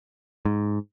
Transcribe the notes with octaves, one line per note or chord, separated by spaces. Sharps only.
G#2